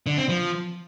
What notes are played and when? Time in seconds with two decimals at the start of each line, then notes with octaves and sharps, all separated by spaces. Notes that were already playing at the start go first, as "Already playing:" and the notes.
0.06 D3
0.18 C4
0.29 F3